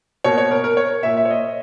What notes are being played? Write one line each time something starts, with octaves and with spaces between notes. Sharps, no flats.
B2 A#3 C#5
C#5
A#4
A#4
C#5
A#2 A#3 E5
E5
C#5
D#5